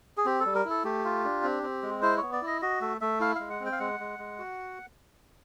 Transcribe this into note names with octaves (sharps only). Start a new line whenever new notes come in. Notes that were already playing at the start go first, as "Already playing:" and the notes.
G#4
C4 G4
A4
G3
A#4
E4 A4
A3 G4
F4
D4
C4
C4
G#3
E4 C5
C#5
B3
D5
E4 D#5
F#4 D#5
A3 E5
A3 E5
E4 F5
G#3 F5
F#5
C4
G5
F5
G#3 F#5
G#3
G#3
F#4